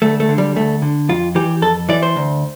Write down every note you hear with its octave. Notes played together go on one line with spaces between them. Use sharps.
D2 A3
A3
D3
G3
D2 A3
D3
F2 F4
E3 G4
F2 A4
E3 D5
C5
D2